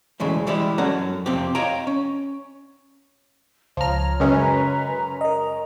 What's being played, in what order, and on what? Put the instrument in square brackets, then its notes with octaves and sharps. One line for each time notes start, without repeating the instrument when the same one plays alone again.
[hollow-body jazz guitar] D2 C#3 E3 G#3 A3
E3 G3 G#3 E4 G4
F#2 F#3 C#4 A4 F#5 A#5
F2 C3 C4 G4
C#5 D#5 F5 G5 A#5
C#4
[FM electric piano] C#2 A#5 [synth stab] F3 F6 [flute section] C#5
[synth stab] F#2 G#3 C#4 [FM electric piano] C#3 [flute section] B4 A#5
[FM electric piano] A#4 D#5 [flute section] A#5